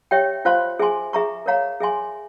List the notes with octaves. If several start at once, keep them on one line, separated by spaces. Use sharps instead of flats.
G4 C#5 E5 G5
F4 C5 F5 C6
G#4 E5 G#5 C6
G#4 E5 A#5 C#6
A#4 C#5 F5 A#5
G#4 E5 G#5 C6